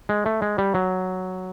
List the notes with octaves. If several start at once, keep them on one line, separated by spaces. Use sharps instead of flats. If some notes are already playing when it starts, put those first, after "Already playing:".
G#3
A3
G#3
G3
F#3